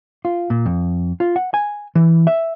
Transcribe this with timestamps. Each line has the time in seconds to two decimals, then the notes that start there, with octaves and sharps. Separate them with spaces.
0.25 F4
0.50 A#2
0.66 F2
1.20 F4
1.36 F#5
1.54 G#5
1.95 E3
2.27 E5